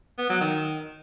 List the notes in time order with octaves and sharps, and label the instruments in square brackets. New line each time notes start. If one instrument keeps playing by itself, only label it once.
[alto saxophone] B3
F#3
D#3